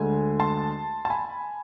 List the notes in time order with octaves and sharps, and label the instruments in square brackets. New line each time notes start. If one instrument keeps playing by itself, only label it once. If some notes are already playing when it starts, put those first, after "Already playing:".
Already playing: [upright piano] D2 D3 G#3 G#5
A5 C6
A5
G#5 B5